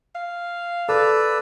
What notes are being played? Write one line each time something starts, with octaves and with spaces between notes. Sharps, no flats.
F5
A4 B4 D5 E6